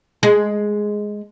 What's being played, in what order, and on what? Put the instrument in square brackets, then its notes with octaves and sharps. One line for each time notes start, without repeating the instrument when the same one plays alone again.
[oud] G#3